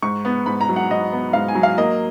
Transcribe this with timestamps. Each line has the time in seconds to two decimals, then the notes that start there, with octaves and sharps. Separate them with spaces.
0.02 G#2 C#6
0.25 B3
0.46 G#2 B5
0.61 A#5
0.69 F#3
0.76 F#5
0.90 G#2 D#5
1.12 B3
1.33 G#2 F5
1.48 G#5
1.55 F#3
1.63 F5
1.78 A#3 D#5